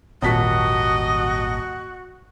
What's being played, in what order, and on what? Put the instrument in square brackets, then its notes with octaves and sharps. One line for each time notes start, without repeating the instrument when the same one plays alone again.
[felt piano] D#1 A5 B6 [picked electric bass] G#1 A#2 [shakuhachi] F#4 [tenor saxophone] D#5